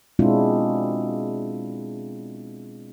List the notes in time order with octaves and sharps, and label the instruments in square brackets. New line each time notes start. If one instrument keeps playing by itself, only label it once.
[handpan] B2 G#3 C4 D4 E4 F4